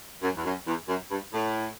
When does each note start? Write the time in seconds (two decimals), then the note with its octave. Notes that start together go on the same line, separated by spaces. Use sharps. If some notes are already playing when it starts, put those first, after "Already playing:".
0.22 F#2
0.35 E2
0.45 F#2
0.67 E2
0.88 F#2
1.11 G2
1.33 A2